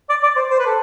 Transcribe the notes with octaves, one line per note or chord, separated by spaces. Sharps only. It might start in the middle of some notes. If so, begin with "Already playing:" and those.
D5
D5
C5
C5
B4
A4